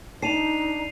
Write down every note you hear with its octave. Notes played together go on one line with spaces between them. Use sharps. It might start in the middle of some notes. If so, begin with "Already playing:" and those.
D4 D#4 A5 C7 D#7 F7